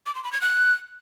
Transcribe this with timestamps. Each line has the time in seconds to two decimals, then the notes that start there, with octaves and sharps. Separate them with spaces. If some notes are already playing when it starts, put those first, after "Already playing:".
0.06 D6
0.15 C6
0.24 B5
0.33 G#6
0.41 F#6